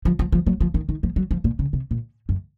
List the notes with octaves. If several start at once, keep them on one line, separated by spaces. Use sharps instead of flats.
F3
F3
F3
F#3
F3
D#3
D#3
F3
F#3
F3
A#2
C#3
C3
A#2
F#2